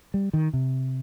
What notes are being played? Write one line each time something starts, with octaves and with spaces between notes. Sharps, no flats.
G3
D#3
C3